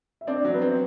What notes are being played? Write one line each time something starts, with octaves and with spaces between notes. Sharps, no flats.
E5
C4 D4 D5
F#3
B3 B4
C4